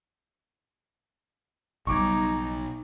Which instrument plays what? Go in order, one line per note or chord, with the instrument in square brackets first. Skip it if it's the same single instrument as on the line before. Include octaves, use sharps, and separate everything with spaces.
[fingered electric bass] B1 [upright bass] C#3 G3 [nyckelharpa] D#4 [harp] C#6 D6 G#6